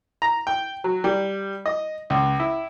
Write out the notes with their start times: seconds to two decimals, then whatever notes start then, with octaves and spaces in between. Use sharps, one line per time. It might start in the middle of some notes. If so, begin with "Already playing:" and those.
0.22 A#5
0.47 G5
0.84 F#3
1.04 G3
1.66 D#5
2.10 C#2
2.40 E4